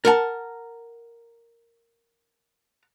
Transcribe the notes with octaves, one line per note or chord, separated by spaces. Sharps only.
A#4 F#5 A5